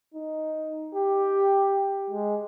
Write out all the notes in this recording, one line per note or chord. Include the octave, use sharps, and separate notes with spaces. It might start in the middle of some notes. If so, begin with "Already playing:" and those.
D#4
G4
G#3